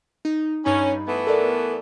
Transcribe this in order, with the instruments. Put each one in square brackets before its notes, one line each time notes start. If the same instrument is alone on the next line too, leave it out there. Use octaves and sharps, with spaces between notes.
[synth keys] D#4
[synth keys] G2 D#4 B5 [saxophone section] C#4
[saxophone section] E3 A3 B3
[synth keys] A4 A#4 D5